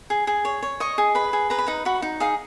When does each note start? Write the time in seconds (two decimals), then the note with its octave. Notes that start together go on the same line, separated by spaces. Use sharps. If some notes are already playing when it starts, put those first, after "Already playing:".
0.10 G#4
0.27 G#4
0.45 C#5
0.63 C#5
0.80 D#5 C#6
0.98 G#4
1.15 B4 B5
1.33 G#4
1.50 B4 A#5
1.58 B5
1.66 D#4 A#5
1.85 F#4 B5
2.02 D#4
2.20 G#4 F5